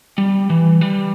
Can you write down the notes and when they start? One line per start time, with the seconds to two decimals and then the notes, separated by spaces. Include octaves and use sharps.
0.18 G3
0.50 E3
0.81 G3